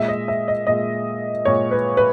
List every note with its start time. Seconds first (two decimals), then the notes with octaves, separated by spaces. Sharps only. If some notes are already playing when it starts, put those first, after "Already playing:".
Already playing: A#2 G#3 E5
0.08 D#5
0.28 E5
0.48 D#5
0.67 A#2 G#3 D#5
1.45 A#2 G#3 C#5
1.71 B4
1.97 B4